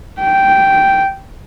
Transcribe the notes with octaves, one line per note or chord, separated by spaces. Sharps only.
G5